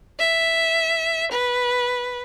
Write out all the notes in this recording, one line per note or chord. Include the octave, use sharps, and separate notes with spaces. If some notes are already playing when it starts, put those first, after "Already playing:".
E5
B4